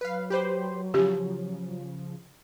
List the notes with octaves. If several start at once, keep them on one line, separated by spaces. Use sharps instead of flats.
F#3 B4 F5
G4 B4 C5
C#3 F3 G4